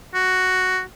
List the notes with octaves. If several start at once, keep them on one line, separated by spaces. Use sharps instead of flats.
F#4